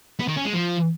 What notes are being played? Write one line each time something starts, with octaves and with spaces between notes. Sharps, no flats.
B3
D#3
C#4
G#3
F3